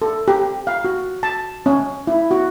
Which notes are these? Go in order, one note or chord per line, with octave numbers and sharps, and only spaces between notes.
A4
G4
F5
F#4
A5
C#4
E4
F#4